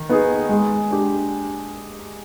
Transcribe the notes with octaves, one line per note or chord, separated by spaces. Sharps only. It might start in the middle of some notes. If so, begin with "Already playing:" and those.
Already playing: D#3
B3 D#4 G#4
G#3
D4 G4